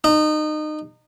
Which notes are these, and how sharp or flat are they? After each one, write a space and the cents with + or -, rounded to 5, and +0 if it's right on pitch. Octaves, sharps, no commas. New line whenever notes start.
D#4 -30